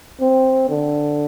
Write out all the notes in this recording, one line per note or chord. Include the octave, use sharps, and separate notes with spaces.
C4
D3